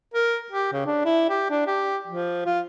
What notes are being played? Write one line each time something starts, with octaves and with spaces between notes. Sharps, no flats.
A#4
G4
C#3
D4
E4
G4
D4
G4
F3
F4